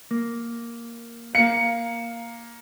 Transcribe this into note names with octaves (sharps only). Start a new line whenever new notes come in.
A#3
A#3 F5 C#7